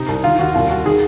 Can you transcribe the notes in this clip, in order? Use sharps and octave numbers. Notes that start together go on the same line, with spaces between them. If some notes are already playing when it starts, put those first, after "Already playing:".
Already playing: C3 D#4
C2
D#3 F4
D#2 F#4
C2 F4
C2 F#4
D#3 G#4